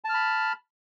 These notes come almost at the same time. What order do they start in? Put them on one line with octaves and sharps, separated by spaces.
A5 F6 B5